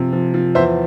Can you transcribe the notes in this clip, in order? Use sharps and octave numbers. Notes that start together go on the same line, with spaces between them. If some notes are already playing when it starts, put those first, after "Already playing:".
Already playing: C3 F3
F3
F3
E2 C5 E5